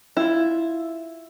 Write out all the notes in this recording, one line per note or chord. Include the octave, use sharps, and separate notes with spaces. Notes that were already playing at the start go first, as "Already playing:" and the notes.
E4 F4